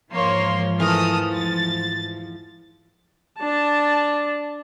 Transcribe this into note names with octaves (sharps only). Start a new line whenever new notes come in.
E2 G#2 F3 A#3 C#5 C6
E3 A3 A4 A#4 D#6 F6
A6
D4 A5